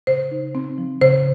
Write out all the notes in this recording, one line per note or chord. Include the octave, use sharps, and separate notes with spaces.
C#3 C5
D#4
C4
F3
C#3 C5